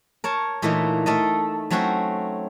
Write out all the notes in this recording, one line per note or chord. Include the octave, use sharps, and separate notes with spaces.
A#4 C#5 A5
A#2 E3 A3 A#3 D#4
A3 A4 A#4 D#5
F#3 A3 C4 C#4 F#4 C5